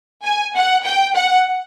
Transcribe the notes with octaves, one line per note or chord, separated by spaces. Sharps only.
G#5
F#5
G5
F#5